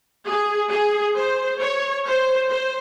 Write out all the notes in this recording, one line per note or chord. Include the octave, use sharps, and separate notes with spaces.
G#4
G#4
C5
C#5
C5
C5